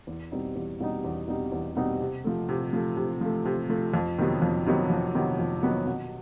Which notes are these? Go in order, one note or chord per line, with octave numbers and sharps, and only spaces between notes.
E2
B2 G3 C4 D#4
E2
B2 G3 C4 D#4
E2
B2 G3 C4 D#4
E2
B2 G3 C4 D#4
C3
F3 A3
C3
F3 A3
C3
F3 A3
C3
F3 A3
F2
C3 D#3 F#3 B3
F2
C3 D#3 F#3 B3
F2
C3 D#3 F#3 B3
F2
C3 D#3 F#3 B3
B2